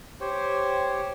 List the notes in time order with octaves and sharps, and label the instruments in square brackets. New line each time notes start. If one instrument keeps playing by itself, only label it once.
[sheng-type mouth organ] G4 C5 C#5